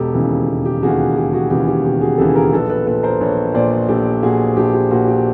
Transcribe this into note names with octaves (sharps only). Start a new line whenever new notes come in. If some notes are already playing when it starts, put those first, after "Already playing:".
Already playing: E1 G4 A4
D#2 C#3 E3
E1
G4
D#2 C#3 E3 F#4 G#4
E1 G4
F#4 G#4
D#2 C#3 E3 G4
G4
E1 G4
F#4 G#4
D#2 C#3 E3 G4 A4
G#4 A#4
A#1 A4 B4
A4 B4
A#2 A4 B4
A#4 C5
A#1 B4 C#5
A#2 C5 D5
A#1 G4 A4
A#2 F#4 G#4
A#1 G4
G4
A#2 F#4
G4